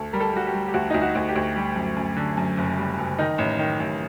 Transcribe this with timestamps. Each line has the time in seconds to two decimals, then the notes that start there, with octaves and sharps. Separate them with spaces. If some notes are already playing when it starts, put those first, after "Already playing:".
Already playing: D2 A4
0.13 G3 A#4
0.20 A4
0.33 G3 F#4
0.47 G4
0.54 G3
0.68 G4
0.74 D2 F#4
0.90 D2 D#4
1.02 F#4
1.15 D2
1.29 G4
1.36 D2
1.56 G3
1.76 F#2
1.97 F#2
2.16 D3
2.37 F#2
2.57 F#1
2.78 G3
2.98 F#1
3.18 D#3 D#4
3.38 A1
3.59 D#3
3.80 A1